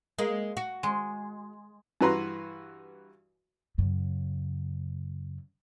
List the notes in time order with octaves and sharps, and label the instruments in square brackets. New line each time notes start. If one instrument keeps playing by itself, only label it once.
[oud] G#3 A#3
F#4
[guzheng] G#3
[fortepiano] G2 E3 F#4 B4 A#5 C6
[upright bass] F#2 C#3